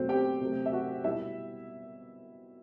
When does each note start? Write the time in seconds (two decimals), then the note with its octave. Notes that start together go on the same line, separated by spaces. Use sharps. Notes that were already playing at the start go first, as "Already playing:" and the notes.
Already playing: B2 F#3 A3 C4 C5
0.09 G4 G5
0.41 C3 F#3 A3
0.66 E5
0.73 F#4 F#5
1.04 B2 G3 E4 E5